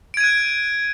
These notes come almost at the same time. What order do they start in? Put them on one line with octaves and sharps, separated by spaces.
D7 G#6 D#7 F#6